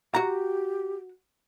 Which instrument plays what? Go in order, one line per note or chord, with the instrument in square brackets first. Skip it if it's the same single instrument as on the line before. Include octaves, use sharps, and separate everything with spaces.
[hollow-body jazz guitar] F#4 A#5 [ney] G4